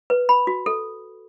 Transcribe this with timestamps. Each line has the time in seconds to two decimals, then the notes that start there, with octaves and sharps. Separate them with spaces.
0.10 B4
0.29 B5
0.47 F#4
0.66 A4